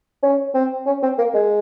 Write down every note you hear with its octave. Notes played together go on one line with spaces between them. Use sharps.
C#4
C4
C#4
C4
A#3
G#3